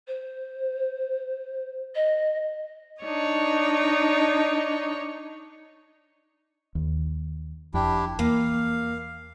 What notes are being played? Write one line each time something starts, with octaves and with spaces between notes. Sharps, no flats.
C5
D#5
D4 D#4 C#5 D#5
D#2
F1 F2 D4 E4 G4
E2 A#3 F5